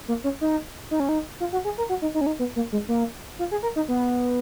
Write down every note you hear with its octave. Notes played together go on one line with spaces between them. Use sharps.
A#3
C#4
D#4
D#4
C#4
D#4
F4
F#4
G#4
A#4
F#4
D#4
D#4
C#4
D#4
B3
A#3
G#3
A#3
F4
G#4
A#4
D#4
B3